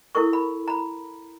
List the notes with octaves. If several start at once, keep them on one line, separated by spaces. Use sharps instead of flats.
E4 A4 A#4 C#6
B5
A#5 B5